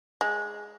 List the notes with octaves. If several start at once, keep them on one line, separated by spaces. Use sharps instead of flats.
G#3